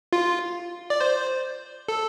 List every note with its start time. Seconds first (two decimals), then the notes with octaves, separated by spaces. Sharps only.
0.13 F4
0.90 D5
1.01 C5
1.88 A4